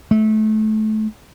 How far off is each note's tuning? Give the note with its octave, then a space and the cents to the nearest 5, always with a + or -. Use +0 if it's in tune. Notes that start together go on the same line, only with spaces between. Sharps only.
A3 -25